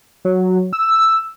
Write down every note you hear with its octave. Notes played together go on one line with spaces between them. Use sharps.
F#3
E6